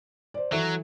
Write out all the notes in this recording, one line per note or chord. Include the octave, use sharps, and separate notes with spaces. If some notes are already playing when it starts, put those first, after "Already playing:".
C5 D5
E3 F#3 A4 E5